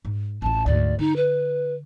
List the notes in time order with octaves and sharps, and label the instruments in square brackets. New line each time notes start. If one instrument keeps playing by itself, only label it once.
[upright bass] G#2
[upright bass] A1 F4 [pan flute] A5
[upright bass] D2 G#2 [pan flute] D5
[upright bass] D3 [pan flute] D#4
[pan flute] B4